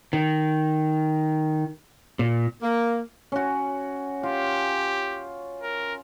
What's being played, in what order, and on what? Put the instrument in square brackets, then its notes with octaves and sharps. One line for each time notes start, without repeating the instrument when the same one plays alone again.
[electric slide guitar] D#3
A#2
[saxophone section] A#3
[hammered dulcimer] C#4 F#4
[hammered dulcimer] F4 [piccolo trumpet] G4
[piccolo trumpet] A#4